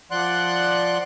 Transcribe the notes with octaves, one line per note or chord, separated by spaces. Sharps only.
F3 D5 F#5 C6 F#6